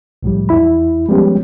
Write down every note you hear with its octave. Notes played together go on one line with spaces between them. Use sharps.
C2 A2 F3 G3
E2 E4 B5
F3 G3 G#3 B3 C#4 G4